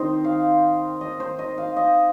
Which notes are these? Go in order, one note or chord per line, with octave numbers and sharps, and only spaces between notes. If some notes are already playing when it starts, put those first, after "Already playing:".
Already playing: D#3 C4 D#4 C5 D#5
F5
D#5
C5
D#5
F5
D#5